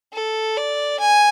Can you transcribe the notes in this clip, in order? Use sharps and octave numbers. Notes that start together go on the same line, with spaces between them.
A4
D5
G#5